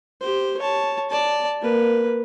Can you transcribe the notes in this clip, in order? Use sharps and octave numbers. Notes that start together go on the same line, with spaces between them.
G4 C5
C#5 A5
D5 A5
A#3 B4